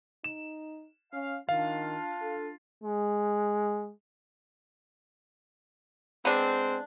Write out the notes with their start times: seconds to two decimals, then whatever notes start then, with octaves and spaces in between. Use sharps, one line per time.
0.24 D#4 E7
1.13 C#4 F5
1.49 D#3 D4 F4 F5
2.22 A4
2.84 G#3
6.25 G#3 B3 C4 D4